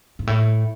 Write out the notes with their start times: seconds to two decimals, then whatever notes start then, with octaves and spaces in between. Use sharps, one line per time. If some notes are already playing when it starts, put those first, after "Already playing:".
0.19 G#2
0.27 A2